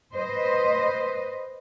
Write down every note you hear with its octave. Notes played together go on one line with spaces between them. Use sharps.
B4 C5 D#5